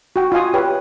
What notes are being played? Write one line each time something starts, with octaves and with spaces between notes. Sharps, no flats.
F#4 G5
F4 D#5 F5 G#5 D#6
G4 B4 C#5 G5